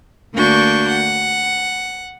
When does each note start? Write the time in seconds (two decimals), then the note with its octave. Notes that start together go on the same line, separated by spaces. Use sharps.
0.34 D2 A#3 D4 F#4 C#6 G6
0.90 F#5